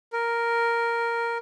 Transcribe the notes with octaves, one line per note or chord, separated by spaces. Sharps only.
A#4